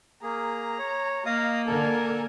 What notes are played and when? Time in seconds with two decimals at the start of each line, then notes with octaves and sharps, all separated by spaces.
0.23 A#3 G#4 A#5
0.79 C#5
1.26 A#3 D#5 F5 D#6
1.67 D3 A4 A#4 G#5 A5